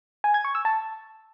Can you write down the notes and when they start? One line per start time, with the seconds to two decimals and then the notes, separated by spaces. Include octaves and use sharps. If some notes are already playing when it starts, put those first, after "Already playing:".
0.24 G#5
0.34 G#6
0.45 C#6
0.55 E6
0.65 A5